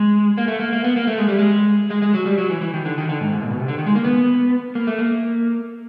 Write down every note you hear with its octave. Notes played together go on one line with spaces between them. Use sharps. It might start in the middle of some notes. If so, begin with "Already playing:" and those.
Already playing: G#3
A#3
A3
A#3
A#3
B3
A#3
A3
G#3
G3
G#3
G#3
G#3
F#3
G3
F#3
E3
E3
D#3
D3
D#3
D3
G#2
G#2
A#2
B2
C3
D3
D#3
G#3
A#3
B3
A#3
A3
A#3